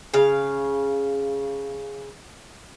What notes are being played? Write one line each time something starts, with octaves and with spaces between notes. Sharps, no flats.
C#3 F5